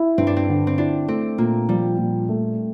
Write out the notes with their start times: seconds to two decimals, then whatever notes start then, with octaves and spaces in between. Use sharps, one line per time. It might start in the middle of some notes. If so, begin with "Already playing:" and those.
Already playing: E4
0.18 G2 C4
0.27 D4
0.36 C4
0.49 D3
0.67 C4
0.78 D4 E4
1.08 A3 C4
1.38 A#2 A#3
1.69 F3 G3
1.98 A#2
2.29 A3